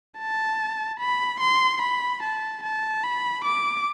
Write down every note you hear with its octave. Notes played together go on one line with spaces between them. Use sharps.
A5
B5
C6
B5
A5
A5
B5
D6